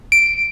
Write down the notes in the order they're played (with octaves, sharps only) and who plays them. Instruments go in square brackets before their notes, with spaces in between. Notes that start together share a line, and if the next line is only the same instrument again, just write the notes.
[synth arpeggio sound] D7